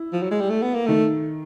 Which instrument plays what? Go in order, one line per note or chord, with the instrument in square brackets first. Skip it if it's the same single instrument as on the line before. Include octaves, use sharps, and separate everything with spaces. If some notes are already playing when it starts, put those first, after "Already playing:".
Already playing: [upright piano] E4
[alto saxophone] F3
F#3
G#3
G3
A3
B3
A#3
[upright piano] D#3 [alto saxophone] A3